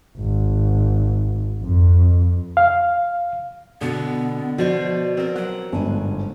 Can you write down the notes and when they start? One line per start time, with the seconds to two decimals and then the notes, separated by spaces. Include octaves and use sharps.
0.16 G#1
1.61 F2
2.57 F5
3.81 B2 D3 B3
4.58 B2 F3 C5 D5 C#6
5.17 C4 A#4 D5
5.36 F#3 F#5
5.72 G1 G#2 G#5 A5